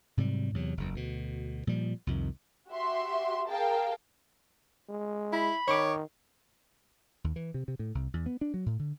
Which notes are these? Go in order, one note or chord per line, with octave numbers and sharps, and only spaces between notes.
G#2 C3 F#3 G3
E2 C3 F#3
F#1 E2
D2 B2
A#2 F3 G3
C2 F2 D#3
F#4 G4 E5 C6
G#4 A#4 F5 G5 A5
G#3
E4 B5
D#3 C#5 C#6 D6
D#2
E3
C3
C3
A2
C2
E2
B3
D4
F#3
A2
D3